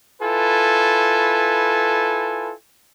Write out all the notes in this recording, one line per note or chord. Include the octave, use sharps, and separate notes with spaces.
E4 F4 A4 B4 G#5